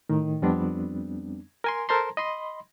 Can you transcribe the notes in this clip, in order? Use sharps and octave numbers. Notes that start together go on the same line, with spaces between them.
A2 D#3
F2 G3 B3 C4 D4
A#4 G#5 C6
A4 A#4 C5 A5 A#5 C6
D#5 B5 C6